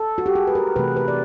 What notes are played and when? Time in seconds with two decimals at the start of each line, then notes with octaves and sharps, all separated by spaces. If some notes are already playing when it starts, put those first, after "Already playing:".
Already playing: A4
0.18 F#4
0.26 G4
0.35 G#4
0.47 B4
0.55 A#4
0.76 C3 E3 A3 B4
0.97 B4
1.08 D5